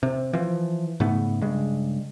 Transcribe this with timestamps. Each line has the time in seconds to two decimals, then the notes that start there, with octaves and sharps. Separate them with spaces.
0.03 C3
0.33 E3 F3
1.00 G#2 C#3 A3 B3
1.42 G2 C#3 G#3